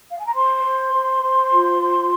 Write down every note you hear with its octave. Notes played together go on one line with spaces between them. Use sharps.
F5
G#5
A#5
C5 C6
C5
C5
C5
F4
C5